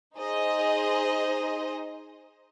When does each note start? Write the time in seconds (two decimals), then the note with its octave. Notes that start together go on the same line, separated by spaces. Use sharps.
0.17 D#4 G#4 C5 D#5